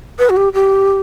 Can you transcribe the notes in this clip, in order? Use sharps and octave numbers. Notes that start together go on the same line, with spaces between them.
B4
F#4
G4
G4